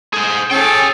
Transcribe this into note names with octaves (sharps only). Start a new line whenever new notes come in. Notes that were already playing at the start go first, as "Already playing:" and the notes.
G#4 C5
C#4 G#4 A4 G5